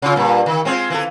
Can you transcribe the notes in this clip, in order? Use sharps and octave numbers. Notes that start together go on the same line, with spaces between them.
C#3 F4
G2 A#2
D#3
G#3 C4 F4
E3 A4